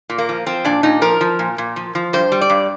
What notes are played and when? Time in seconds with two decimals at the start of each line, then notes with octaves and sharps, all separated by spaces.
0.10 A#2
0.18 A#3
0.29 F3
0.46 F3 C4
0.65 A#2 D4
0.83 A#2 D#4
1.01 F3 A#4
1.21 F3
1.39 A#2
1.58 A#2
1.76 F3
1.95 F3
2.13 G2 C5
2.32 G3
2.41 D5
2.50 G2